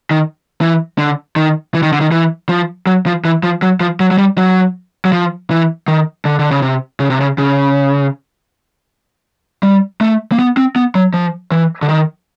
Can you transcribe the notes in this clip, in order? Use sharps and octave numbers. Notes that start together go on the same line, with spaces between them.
D#3
E3
D3
D#3
E3
D#3
D3
D#3
E3
F3
F#3
F3
E3
F3
F#3
F3
F#3
F#3
G3
F#3
F#3
F3
E3
D#3
D3
D3
C#3
C3
C#3
C3
C#3
C#3
G3
A3
A#3
B3
C4
B3
F#3
F3
E3
D3
D#3